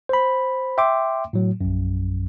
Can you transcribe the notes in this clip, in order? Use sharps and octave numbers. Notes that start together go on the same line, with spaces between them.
C5 B5
E5 G5 C6 D6
A2 F#3
A#1 F#2